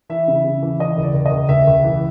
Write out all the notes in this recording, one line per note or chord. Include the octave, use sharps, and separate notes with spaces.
E3 E5
C#3
C#3
E3
E3 D#5
C#2
D5
C#2
D#5
C#2
C#2 E5
C#2
E3